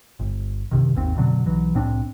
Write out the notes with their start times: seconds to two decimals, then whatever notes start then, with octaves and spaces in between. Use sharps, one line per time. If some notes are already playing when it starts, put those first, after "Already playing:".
0.19 G1
0.71 F#2 C3 D#3
0.95 G#1 D#2 C4
1.15 F#2 B2 D3 F#3
1.46 B1 E3 F#3
1.74 C2 A2 C4 D4